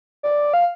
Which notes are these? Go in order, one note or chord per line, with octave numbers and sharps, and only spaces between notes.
D5
F5